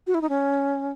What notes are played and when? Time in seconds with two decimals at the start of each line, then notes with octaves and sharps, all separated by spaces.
0.07 F#4
0.15 E4
0.21 D#4
0.29 C#4